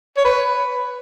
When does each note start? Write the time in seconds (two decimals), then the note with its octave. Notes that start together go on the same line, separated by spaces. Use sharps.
0.17 C#5
0.25 B4